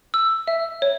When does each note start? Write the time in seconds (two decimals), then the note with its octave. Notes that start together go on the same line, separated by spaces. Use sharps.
0.14 E6
0.47 E5
0.82 C#5